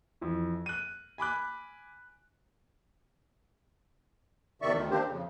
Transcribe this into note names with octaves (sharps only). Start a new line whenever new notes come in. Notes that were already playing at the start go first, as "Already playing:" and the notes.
F2 E3
F#6 D#7
G#5 B5 D6 F#6
E2 C3 D#3 D5 E5 C#6
D2 D#3
A#3 C4 D4 G4 C5
F2 C#3